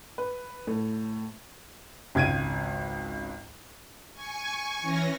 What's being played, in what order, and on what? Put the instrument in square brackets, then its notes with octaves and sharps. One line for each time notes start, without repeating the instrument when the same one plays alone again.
[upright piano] B4
A2
G#1 C#2 G#6 D7 D#7
[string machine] G#5 C#6
E3 C#4 A#6